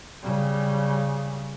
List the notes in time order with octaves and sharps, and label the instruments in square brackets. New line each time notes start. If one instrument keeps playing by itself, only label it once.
[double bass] C#3 G3